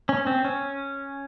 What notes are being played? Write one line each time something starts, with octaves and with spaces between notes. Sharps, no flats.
C#4
C4
C#4